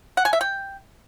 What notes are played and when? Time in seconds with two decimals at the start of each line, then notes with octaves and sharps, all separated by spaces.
0.17 F#5
0.25 G#5
0.33 E5
0.41 G5